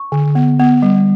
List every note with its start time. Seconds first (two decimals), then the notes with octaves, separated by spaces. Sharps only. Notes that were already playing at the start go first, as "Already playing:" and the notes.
Already playing: C#6
0.12 D3
0.35 B3
0.59 B3
0.82 G3